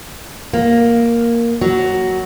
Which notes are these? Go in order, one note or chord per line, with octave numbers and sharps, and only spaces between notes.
A#3
F#3